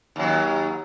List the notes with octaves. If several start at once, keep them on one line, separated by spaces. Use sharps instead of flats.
D#2 F#3